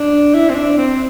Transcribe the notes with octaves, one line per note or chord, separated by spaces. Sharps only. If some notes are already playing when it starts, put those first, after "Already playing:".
Already playing: D4
E4
C4
D4
C4